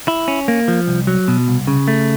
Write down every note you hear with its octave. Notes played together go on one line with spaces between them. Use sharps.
E4
C#4
A#3
F3
C2
F#3
B2
C2
C#3
A3